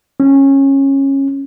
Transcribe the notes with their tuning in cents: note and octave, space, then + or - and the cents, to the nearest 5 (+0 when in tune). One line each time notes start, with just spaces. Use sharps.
C#4 -20